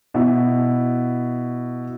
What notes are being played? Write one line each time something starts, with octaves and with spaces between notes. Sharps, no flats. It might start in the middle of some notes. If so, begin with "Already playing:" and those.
B2 E4